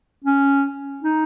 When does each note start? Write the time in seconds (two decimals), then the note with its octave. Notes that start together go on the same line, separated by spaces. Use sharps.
0.24 C#4
1.03 D#4